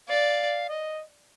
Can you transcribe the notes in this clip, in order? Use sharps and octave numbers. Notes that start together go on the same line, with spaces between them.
D5 F5
D#5